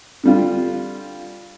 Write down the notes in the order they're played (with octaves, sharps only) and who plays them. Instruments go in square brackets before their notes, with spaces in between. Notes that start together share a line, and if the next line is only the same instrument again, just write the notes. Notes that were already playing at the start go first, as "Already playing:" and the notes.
[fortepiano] D3 G3 F4